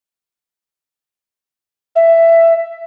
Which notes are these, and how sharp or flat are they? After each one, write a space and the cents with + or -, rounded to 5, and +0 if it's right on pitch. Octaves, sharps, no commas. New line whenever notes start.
E5 +10